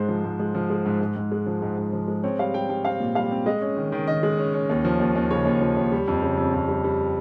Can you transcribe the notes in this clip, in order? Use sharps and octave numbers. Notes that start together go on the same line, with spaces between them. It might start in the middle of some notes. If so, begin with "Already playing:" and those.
Already playing: G#2 G#3 C5
F3
G#2
G#3
F3
G#3
G#2
G#2
G#2
G#3
F3
G#2
G#2
F3
G#3
C4 C#5
G3 F5
G3 G5
G3 G5
C4 F5
A#2
G3 F5
C4
G#3 D#5
C#4
D#3
D#3
D#3 D#5
G#3
C#4
C#4
D#2
F3
D#2
D#2
C#3 C#5
D#2
F3
D#2
G3
F2
C#3
F2
F2
G3
G3